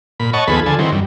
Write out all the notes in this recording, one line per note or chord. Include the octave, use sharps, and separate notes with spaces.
A#2 B5
C#5 D#5 F#5 A5 C#6
D#2 F3 B3 G#4 A4 B5
D3 F3 A4 G#5
D#3 E3 F#3 C4
F#2 G3